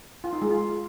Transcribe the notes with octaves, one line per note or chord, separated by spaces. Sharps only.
F4
D#4
G#3
F4